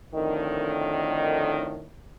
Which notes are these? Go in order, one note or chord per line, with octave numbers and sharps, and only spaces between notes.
F2 A2 D3 D#3